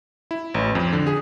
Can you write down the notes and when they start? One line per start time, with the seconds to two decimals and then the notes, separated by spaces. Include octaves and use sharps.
0.31 E4
0.54 A1
0.75 F2
0.93 D3
1.07 G#4